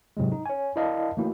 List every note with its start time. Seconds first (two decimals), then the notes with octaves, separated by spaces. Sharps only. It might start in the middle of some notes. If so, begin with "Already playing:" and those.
0.17 G#2 C3 F#3 G#3
0.32 D#4
0.46 C#5 G#5
0.76 E4 A#4 D5 D#5 F5 A5
1.17 E3 A3 A#3 D#4 E4 F#4